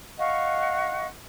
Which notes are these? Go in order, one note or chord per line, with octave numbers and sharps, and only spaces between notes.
D#5 F5 F#5 C#6